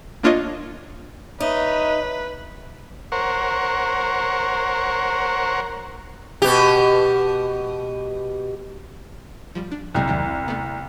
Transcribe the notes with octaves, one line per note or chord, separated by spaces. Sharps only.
A#3 D4 F4 C#5 D#5
D#4 B4 C#5 D#5 E5
A#4 C5 C#5 F#5
B2 G4
F3 G3
D4
C2 B2 F#3 G#3
E2 D#3 F#3
A3 B3